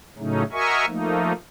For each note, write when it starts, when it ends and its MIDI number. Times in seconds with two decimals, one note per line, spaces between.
0.18 0.43 45
0.18 0.43 49
0.18 0.43 54
0.18 0.43 57
0.18 0.43 61
0.18 0.43 63
0.52 0.85 66
0.52 0.85 70
0.52 0.85 75
0.52 0.85 76
0.52 0.85 80
0.52 0.85 85
0.86 1.33 53
0.86 1.33 57
0.86 1.33 58
0.86 1.33 63